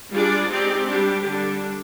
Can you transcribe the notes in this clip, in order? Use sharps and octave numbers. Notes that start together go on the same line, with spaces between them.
G3 D4 F4 G#4 D5
G#3 C4 D#4 G4 D5
G3 D4 G4
D3 G3 D4